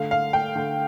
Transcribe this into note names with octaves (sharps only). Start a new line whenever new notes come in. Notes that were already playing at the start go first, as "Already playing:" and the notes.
Already playing: D3 A3 F5
F5
G5
D3 A3